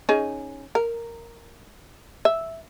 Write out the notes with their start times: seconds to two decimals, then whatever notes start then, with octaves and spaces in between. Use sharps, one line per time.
0.09 C#4 D#4 G#4
0.75 A#4
2.25 E5